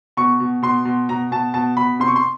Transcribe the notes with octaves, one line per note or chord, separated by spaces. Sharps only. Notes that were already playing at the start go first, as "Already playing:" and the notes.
B2 C#6
B2
B2 C6
B2
B2 A#5
B2 A5
B2 A5
B2 B5
C3 C6
C#6
C6